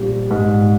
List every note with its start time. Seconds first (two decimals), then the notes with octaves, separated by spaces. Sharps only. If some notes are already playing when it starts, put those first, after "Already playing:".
Already playing: A#1 G3
0.31 G#2